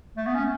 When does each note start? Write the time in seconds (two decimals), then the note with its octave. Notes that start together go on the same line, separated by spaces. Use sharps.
0.17 A3
0.27 B3
0.35 C#4